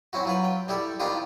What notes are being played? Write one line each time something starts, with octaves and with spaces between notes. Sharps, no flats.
C4 C#4 E4 F#4
F#3 F4 B4
G5
G3 E4 G4 A4
D#3 C4 D4 E4 F4 G4